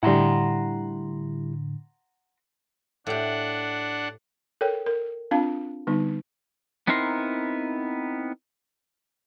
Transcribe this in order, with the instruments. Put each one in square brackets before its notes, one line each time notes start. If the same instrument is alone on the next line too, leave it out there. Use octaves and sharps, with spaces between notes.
[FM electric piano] A2 D3 [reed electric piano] G3 E4 [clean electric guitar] F#5 A#5 C6
[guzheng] A2 G4 [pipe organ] D4 F#5
[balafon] A4 A#4 C#5 G5
A#4
C4 D4 F4 F5 A5
D3 G3 B3 D#4
[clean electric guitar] B3 C4 D#4 E4 A#4 C6